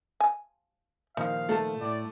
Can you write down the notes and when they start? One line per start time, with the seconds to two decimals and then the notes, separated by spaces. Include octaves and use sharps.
0.20 G#5
1.17 A#2 D#3 F3 D#4 F5
1.49 A3 A5
1.81 A2 D5